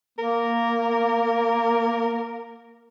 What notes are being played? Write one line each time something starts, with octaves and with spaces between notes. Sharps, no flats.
A#3 A#4